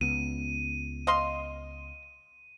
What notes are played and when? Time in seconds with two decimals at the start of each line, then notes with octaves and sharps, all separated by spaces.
0.01 C#2 B3 D#7
1.07 D#5 F5 C6